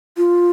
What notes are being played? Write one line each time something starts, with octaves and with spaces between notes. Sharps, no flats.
F4